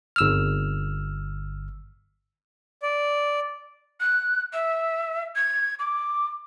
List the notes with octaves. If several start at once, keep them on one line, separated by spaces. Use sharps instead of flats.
G1 E6 F6
D5
F#6
E5
G#6
D6